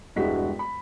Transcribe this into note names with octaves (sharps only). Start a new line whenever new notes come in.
E1 G2 G#3 E4 F#4 B6
B5